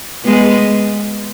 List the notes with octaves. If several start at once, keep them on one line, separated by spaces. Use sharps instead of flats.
G#3 B3